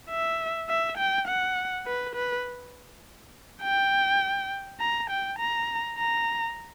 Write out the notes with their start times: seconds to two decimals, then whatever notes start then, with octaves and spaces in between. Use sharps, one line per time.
0.10 E5
0.69 E5
0.98 G5
1.28 F#5
1.87 B4
2.15 B4
3.63 G5
4.81 A#5
5.10 G5
5.39 A#5
5.98 A#5